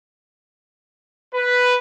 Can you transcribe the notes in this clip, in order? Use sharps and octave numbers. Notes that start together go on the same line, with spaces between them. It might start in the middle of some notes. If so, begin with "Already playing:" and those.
B4